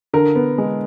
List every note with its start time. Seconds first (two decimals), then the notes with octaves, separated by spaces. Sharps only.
0.14 D3 A#4
0.36 B3
0.58 G#3